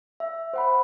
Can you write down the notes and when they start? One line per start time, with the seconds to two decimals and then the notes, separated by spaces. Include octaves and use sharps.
0.20 E5
0.53 C5 F#5 B5